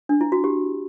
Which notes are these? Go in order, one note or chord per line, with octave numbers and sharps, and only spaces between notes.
D4
E4
F#4
G4